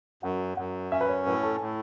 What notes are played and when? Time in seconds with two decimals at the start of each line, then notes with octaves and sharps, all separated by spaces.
0.23 F#2 F#5
0.57 F#2 F#5
0.92 C#4 E5
1.01 B4
1.09 C#5
1.26 A2 B4
1.43 A4
1.61 A2